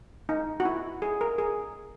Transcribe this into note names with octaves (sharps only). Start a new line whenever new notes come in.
D#4
F#4
E4
G#4
A#4
G#4